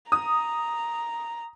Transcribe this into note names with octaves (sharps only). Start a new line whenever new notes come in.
A#5 D#6